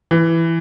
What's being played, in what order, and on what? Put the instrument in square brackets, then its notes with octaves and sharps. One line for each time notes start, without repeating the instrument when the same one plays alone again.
[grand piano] E3